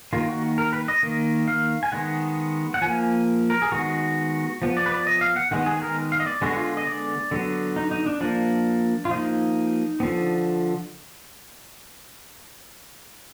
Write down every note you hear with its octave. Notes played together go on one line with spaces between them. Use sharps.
D#3 A#3 F4
F#4
A#4
B4
D#5
D#3 A#3
F5
G#5
D#3 G#3 B3 F#5
F#5
F3 A#3 G#5
A#4
G#4
D#3 G#3 B3 F#4
F3 B3
D5
B4
D5
D#5
F5
F#5
D#3 G#3 B3 F#5
G#4
A#4
F5
D#5
D5
D3 G#3 B3 F#4
F4
D#5
D5
D3 F#3 B3
D#4
D#4
D4
F3 A#3 D4
F4
F3 A#3 D#4
B3
D3 F3